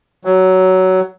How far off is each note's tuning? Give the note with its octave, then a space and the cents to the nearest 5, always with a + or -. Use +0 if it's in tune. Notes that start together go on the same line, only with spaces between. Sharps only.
F#3 +15